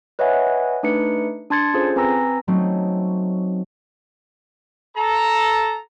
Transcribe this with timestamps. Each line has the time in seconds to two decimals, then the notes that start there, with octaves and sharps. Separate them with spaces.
0.19 B4 C#5 D#5 E5 F#5 G#5
0.83 A3 D4 D#4 B4 C#7
1.50 D4 A5 C6 G#6 A6 C#7
1.74 C#4 F4 G#4 A4 C5
1.96 C4 B4 G#5 A#5 E6 A#6
2.48 F#3 A3 C4 C#4 D#4
4.95 A4 A#5